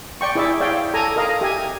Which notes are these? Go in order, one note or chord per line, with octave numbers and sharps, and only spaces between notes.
D5 G5 C#6
E4 G#4 D5 E5 D6
C#5 D5 E5 F5 G5
A4 G#5 A#5
A#4 D#5 F5 A#5
G4 E5 G#5